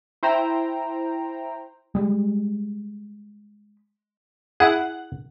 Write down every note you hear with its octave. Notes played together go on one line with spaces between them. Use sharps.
E4 C5 G5 A#5
G3 G#3
E4 G#4 F#5